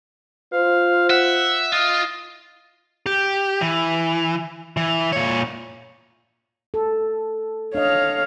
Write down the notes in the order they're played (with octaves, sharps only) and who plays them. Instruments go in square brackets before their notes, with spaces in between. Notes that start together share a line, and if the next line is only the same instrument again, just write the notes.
[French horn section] F4 C5 [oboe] F5
[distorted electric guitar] E5 [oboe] F#5
[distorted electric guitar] F4 [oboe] D#5
[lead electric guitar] G4
E3
E3
A#2 C#5
[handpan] A4
[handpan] D4 D#5 [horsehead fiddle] C#5 F5